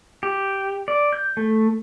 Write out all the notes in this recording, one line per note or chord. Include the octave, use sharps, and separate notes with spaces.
G4
D5
G6
A3